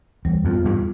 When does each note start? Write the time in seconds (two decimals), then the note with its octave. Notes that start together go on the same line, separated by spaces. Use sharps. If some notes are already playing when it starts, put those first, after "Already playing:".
0.25 E2 G3
0.45 F2 B3 F4
0.65 E2 G2 G3